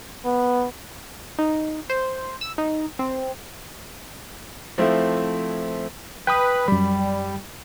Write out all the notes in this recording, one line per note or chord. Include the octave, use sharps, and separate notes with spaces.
B3
D#4
C5
E6
D#4
C4
F3 A3 C4 E4
B4 G5 B5 D#6
F#2 G3 B5